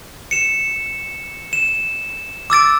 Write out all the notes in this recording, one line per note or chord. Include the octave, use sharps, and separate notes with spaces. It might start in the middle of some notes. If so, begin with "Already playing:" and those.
C#7 E7
E7
D6 E6 A6 D7